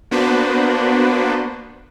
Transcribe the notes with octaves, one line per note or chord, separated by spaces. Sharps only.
A#3 B3 D4 F#4 B4 C5